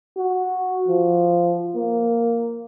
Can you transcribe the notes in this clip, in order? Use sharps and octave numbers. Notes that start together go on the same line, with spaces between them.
F#4
F3
A#3